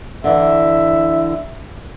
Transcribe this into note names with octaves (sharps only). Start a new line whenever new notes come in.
D3 E3 E5